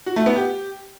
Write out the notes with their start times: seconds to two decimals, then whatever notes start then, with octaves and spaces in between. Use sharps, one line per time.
0.06 F#4
0.16 A3
0.26 B3
0.36 G4